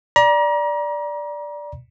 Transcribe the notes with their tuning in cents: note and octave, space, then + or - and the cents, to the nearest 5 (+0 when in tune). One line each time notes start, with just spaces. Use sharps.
D5 +0 A#5 +35